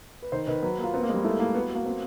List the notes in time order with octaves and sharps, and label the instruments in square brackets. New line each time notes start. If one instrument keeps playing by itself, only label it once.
[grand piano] B4
[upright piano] D#3 [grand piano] C5
[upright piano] D#3 [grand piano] B4
[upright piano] F#3 [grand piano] B4
[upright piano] A#3 [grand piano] F4
[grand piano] B3 [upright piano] C4
[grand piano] A#3
[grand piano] G3 [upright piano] G#3
[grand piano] A3 [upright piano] E4
[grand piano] A#3 [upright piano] E4
[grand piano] B3 [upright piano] F#4
[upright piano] F#4
[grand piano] A#3
[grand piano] A#3 [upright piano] C4